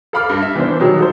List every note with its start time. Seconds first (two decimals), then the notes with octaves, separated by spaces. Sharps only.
0.13 A4 A#4 F5 B5 D6 F6
0.29 G2
0.42 E5
0.55 E3 B3 D4 C5
0.80 B2 D#3 F#3 G3
0.98 F4 A4 C5